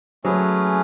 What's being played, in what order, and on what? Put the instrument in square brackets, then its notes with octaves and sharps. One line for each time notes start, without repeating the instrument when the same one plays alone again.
[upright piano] F#3 [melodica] A3 C#4 G#4 B4